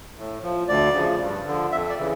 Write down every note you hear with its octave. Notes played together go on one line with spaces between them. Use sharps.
A2
F3
D2 D5
C#3 F3
G2
D3 F3
F2 E5
D5
C#3 E3